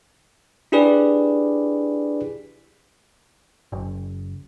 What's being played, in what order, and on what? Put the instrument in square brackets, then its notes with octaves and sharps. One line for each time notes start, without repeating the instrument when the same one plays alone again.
[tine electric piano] D4 E4 G4 G#4 B4 D5
[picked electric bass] F#1